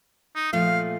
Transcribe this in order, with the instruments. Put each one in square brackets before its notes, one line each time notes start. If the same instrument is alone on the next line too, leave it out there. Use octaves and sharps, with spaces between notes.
[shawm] D#4
[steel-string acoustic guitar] A#2 F3 A3 [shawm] F5